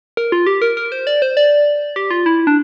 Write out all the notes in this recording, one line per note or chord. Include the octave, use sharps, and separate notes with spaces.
A#4
F4
G4
A#4
A#4
C5
D5
C5
D5
G4
F4
E4
D4